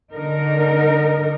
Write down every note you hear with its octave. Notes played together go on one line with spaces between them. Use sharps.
D3 D#4 A#4